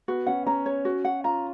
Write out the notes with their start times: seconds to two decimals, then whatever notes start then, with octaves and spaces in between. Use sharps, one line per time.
0.08 B3 F#4
0.27 C#4 F#5
0.46 C#4 A#5
0.66 C#5
0.85 F#4
1.05 F#5
1.24 F4 A#5